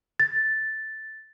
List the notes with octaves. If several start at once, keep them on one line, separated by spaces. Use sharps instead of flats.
A6